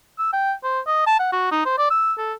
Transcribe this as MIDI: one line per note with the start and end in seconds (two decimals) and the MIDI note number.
0.19 0.30 88
0.33 0.52 79
0.64 0.80 72
0.87 1.06 75
1.07 1.19 81
1.20 1.31 78
1.32 1.48 66
1.51 1.61 63
1.65 1.73 72
1.78 1.90 74
1.91 2.13 88
2.18 2.33 69